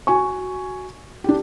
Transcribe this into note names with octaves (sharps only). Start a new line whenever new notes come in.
F#4 G#5 C#6
D4 G4